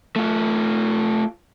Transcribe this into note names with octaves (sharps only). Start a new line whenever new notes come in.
A3 F4